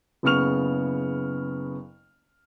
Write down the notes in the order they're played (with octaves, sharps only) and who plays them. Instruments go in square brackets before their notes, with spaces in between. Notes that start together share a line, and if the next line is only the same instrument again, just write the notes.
[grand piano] F#1 C#3 B3 C#6 F6 F7